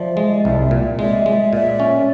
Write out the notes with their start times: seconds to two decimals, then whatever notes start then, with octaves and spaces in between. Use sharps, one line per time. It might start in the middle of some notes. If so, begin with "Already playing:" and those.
Already playing: F3 D5 E5
0.17 G#3
0.45 C2
0.71 A#2
0.99 G#3 D5 E5
1.26 G#3
1.52 A#2 D5 E5
1.80 C#4